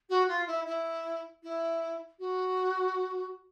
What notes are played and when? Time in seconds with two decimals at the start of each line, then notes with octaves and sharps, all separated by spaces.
0.09 F#4
0.27 F4
0.46 E4
0.66 E4
1.43 E4
2.19 F#4